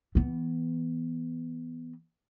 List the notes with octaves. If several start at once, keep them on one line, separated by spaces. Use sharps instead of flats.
E3 B3